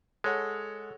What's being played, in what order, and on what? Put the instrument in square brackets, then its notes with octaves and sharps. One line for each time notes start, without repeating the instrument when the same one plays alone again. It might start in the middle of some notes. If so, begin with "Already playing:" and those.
[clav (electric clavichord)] G#3 [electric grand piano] A4 C#5 F#5